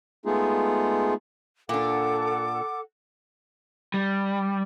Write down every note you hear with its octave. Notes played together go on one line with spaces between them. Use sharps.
G#3 A3 B3 D#4 F4 G#4
A#2 D4 A4 F#5 D6
G3